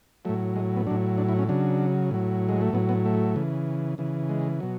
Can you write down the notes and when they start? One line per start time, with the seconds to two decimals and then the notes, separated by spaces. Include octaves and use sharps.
0.25 A2 F#3 A3
0.56 G#3
0.76 B3
0.87 A2 F#3 D4
1.18 D4
1.29 E4
1.39 C#4
1.49 C#3 F#3 D4
2.11 A2 F#3
2.49 G#3
2.61 A3
2.73 A2 F#3 B3
2.89 B3
3.05 A3
3.36 C#3 E3
3.98 C#3 E3
4.29 G#3
4.60 B2 F#3